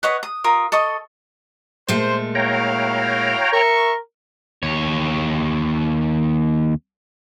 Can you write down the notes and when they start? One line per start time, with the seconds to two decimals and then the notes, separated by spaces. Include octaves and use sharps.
0.03 B4 C#5 D#5 F#5
0.23 D#6
0.44 F4 A#4 D#6
0.72 A4 D#5 C#6 D#6
1.88 A#2 G#3 A3 C5
2.35 E4 F#4 C#5 F5 G5 A#5
3.53 A#4 E5 C#6
4.63 D#2 C#5